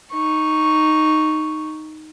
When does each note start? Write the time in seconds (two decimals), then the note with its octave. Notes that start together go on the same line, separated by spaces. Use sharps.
0.13 D#4 C#6